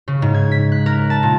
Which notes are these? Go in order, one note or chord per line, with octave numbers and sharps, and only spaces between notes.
C#3
G#2
G#6
B6
F#6
A#4
A5
A#2